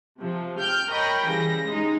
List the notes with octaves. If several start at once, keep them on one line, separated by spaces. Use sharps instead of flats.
C3 F3
G5 F6 G6
A#4 C#5 D#5 G5 B5
C#3 E3 G3 A#6
G#3 D#4